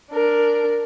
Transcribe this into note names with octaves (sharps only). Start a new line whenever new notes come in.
D4 A#4